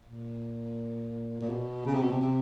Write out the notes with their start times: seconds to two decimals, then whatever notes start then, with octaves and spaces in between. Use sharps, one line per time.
0.05 A#2
1.41 A#2
1.49 B2
1.86 C#3
1.94 C3
2.02 B2
2.10 C3
2.22 C3